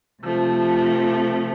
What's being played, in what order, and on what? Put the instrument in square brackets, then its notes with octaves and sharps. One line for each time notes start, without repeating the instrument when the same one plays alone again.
[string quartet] C3 F3 A3